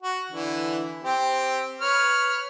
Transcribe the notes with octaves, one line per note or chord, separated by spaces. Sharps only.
F#4
D3 E3
C4 G4
B4 C#5 F6